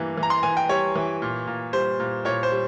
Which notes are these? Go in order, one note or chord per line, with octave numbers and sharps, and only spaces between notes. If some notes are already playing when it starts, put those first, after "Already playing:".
Already playing: G2 E3 A#3
E3
A#5
C6
E3 G#5
G5
G3 C#5
E3
A#2
A#2
G3 C5
A#2
A#2 C#5
C5
G3